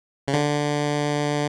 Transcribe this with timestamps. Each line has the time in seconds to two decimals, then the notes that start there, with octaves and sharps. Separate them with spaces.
0.28 C#3
0.34 D3